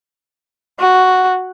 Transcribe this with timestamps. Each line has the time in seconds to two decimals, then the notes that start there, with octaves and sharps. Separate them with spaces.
0.80 F#4